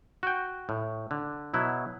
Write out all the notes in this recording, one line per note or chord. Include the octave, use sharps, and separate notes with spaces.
F#4 G5
A2
D3
B2 F#3 E4